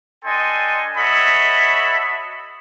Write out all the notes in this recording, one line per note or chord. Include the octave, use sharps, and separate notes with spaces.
D4 A4 D#5 G5 G#5 C6
F#4 A4 C#5 D#5 E5 B5